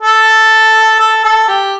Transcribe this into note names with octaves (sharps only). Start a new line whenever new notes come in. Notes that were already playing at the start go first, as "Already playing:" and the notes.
A4
A4
A4
G4